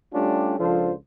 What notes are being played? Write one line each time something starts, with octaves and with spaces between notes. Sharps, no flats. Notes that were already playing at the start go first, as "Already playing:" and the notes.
G3 A3 C#4 D4 F4 G4
C#2 F3 D4 F4 A4 C5